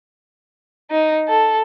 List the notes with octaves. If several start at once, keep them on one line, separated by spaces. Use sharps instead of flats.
D#4
A4